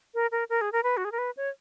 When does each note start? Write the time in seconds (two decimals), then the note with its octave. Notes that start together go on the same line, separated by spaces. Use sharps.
0.14 A#4
0.32 A#4
0.50 A#4
0.61 G#4
0.73 A#4
0.83 B4
0.97 F#4
1.05 G#4
1.12 A#4
1.18 B4
1.37 C#5